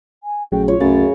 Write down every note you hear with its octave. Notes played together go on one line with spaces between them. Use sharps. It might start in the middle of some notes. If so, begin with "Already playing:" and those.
G#5
A#1 C#3 F#3 A3 G5
F4 C#5
C2 F#2 C#3 A3 C#4 A6